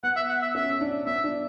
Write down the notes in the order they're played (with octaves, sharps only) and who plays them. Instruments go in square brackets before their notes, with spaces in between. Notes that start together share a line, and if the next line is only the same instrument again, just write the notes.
[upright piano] B3 [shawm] F#5
[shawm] E5
F#5
E5
[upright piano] C#4 [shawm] E5
[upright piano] D4
[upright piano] B3 [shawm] E5
[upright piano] D4